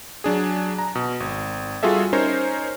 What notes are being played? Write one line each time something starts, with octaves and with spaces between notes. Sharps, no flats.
F#3 D4 G#4
A#5
B2
G#1
G3 F4 F#4 G#4 A4 E5
C#4 D#4 A#4 C5 C#5